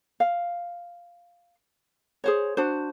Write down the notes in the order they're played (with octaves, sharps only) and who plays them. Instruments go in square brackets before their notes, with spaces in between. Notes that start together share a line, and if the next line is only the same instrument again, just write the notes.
[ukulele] F5
G#4 C5 C#5
D4 F#4 C5